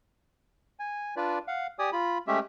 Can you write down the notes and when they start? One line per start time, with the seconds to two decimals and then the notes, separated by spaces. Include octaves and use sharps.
0.80 G#5
1.17 D4 F4 B4 D5
1.48 F5 F#5
1.79 G4 D5 G#5 D#6
1.93 F4 B5
2.27 G#3 A3 C#4 G4 E5